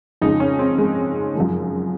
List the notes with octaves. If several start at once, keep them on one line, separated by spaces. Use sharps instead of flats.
F2 C#3 G#3 D#4
C#4
C4
G#3
F#2 F3 G#3